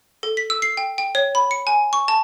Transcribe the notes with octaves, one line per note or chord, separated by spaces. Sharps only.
A4
B6
E6
C7
G5
G5
C#5
B5
C#7
G#5
C#6
A5